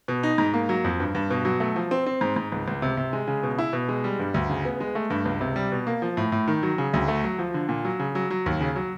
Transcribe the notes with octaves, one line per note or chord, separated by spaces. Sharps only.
B2
D#4
G#2
A#3
F#3
F2
G2
G2
B2
F#3
A3
F3
C4
C4
G#2
G#2
C#2
C#2
C3
C3
G#3
C#3
B2
E4
B2
G#3
G3
G2
D2
C#3
B3
G#3
A3
G2
C#2
C3
G3
B2
A#3
F3
A2
A2
D#3
F#3
C#3
D2
A3
F#3
F3
D3
A#2
F#3
C#3
F#3
F#3
D#2
C#3
F#3